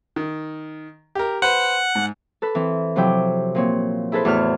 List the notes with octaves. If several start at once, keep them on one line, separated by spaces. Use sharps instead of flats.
D#3
G4 A#4
B4 C5 F#5
G#2
A4 B4
E3 C4
C3 F3 F#3 E4 G5
A#2 C4 C#5
E4 G#4 A4 B4 C5
E2 A2 F#4 C5 C#5 F6